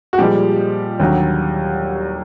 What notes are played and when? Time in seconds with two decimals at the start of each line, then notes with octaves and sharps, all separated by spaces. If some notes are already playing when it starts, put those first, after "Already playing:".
0.13 F#4
0.18 A#2 F3 G3 G#3 G4
1.00 D#2 D3 F#3